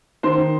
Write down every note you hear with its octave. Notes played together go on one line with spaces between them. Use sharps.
D#3 C5 C6
D#3